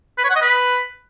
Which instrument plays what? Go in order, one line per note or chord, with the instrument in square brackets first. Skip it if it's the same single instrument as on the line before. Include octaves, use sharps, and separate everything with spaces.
[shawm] B4
C#5
F#5
D#5
B4